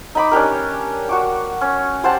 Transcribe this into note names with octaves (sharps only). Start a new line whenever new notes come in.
D#4 B5 D6
C#4 D4 G4 A#4
F#4 C#6 D6
C#4
G4 C5 F#5 A5